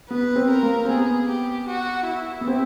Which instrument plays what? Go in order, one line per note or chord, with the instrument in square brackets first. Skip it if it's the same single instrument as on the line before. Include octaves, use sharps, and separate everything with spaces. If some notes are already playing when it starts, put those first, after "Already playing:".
[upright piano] B3 [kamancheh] B4
[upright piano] C4
[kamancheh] A#4
[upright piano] A#3
C4
[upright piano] B3 [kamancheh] G#4
[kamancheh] G4
F#4
E4
[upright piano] B3
C4